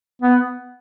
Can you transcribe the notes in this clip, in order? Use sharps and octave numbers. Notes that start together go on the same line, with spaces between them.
B3